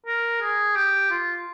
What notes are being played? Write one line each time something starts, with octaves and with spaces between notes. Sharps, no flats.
A#4
G#4
G4
F4